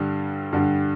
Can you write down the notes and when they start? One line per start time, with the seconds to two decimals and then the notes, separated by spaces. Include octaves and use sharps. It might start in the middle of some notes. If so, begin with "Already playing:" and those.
Already playing: G2 D3 G3
0.53 G2 D3 G3